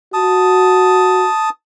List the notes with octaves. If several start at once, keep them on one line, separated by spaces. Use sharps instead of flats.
F#4 A5 D#6